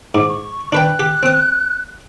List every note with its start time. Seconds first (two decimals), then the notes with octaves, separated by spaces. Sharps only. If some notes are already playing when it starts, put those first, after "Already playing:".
0.15 G#2 D6
0.29 C#6
0.72 D4 B4 G5 F#6
0.99 G4
1.23 C4 D#6